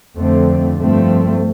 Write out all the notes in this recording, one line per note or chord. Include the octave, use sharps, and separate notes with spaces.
F2 D3 A3 C4
G2 F3 A3 C4